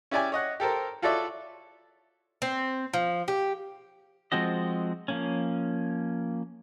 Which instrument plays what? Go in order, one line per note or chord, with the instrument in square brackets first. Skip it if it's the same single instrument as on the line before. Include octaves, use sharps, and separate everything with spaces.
[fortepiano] C#4 E4 G4 D5 E5 G#5
C#5 D#5 F#5
G4 A4 A#4 C5
F4 F#4 A4 C#5 D5 E5
[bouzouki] C4
F3
G4
[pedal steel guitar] F3 G#3 C4 F#4 D#5
F3 A#3 C#4